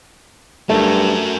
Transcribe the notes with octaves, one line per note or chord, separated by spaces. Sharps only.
G2 F#3 A3 A#4